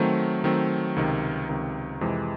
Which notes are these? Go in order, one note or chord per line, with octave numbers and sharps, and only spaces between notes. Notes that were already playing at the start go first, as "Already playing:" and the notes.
Already playing: D#3 F#3 A3 C4
D#3 F#3 A3 C4
C#2 C3 D#3
C#2 C3 D#3
F2 C3 E3 G#3